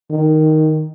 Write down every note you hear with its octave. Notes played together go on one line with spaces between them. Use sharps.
D#3